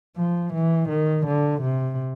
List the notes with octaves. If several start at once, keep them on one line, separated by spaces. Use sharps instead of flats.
F3
E3
D#3
D3
C3